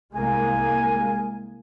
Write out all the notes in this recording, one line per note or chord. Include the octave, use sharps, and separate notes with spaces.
C2 G#3 A#3 G#5